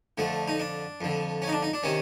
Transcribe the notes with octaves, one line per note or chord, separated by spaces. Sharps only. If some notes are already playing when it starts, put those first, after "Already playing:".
F2 D3 A3
D#4
D4
F2 D3
C#4
D#4
D4
D#4
D4
C3 D#3 C#4